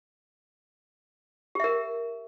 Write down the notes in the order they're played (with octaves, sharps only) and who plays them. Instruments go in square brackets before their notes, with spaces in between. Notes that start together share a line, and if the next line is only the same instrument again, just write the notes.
[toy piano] G4
E5
A#4